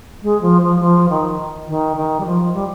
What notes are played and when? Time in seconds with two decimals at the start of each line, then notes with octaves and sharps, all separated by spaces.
0.23 G#3
0.42 F3
0.62 F3
0.80 F3
1.09 D#3
1.68 D#3
1.96 D#3
2.20 G3
2.26 F3
2.54 G3